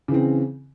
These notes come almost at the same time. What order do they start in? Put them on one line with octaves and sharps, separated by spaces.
C#3 E3 C4